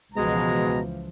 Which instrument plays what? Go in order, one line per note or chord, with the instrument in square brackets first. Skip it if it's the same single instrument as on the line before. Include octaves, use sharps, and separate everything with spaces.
[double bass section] C#2 E3 F3 [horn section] B2 A#5 [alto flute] G#3